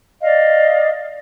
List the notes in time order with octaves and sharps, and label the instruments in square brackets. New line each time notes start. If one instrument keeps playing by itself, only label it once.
[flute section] D5 D#5 F5